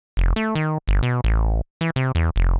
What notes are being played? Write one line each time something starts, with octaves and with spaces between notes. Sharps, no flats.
F1
A3
D#3
G1
B2
A1
E3
C3
E2
F1